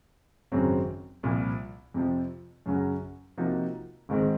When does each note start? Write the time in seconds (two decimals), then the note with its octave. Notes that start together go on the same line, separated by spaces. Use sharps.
0.52 G#1 F#2 C#3 F#3 C4
1.23 C2 A#2 F3
1.94 F2 C3 F3
2.66 F#2 C#3 F#3 C#4 F#4
3.38 C3 F3 A#3 D#4 F#4
4.09 G#1 G#2 D#3 G#3 C4